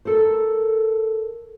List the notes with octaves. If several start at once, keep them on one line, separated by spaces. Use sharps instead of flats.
A4 A#4 C5